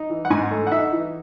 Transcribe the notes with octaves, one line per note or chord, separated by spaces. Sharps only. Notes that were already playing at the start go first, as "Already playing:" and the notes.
Already playing: D#4
E3
F#5
G#2 G#5
A3
F#5
D#4 E5
E3